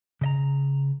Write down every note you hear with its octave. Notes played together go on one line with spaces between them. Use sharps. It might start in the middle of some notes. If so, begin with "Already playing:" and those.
C#3 D#5 A#5